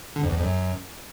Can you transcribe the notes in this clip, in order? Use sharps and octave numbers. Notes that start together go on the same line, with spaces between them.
D3
F2
E2
F2
F#2